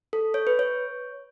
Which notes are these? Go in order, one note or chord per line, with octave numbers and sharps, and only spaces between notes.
A4
C#5
B4
C#5